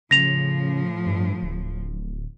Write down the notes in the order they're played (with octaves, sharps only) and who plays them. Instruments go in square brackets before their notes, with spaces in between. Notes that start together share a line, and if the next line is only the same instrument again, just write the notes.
[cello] A2 F3 [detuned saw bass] C#3 [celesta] A#6 F7
[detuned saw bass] G2
D1